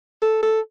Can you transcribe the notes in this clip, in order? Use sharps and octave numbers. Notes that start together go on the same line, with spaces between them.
A4
A4